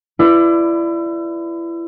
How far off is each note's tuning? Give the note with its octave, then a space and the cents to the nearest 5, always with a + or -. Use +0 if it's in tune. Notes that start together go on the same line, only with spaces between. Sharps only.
E4 +30 B4 +15 D5 +10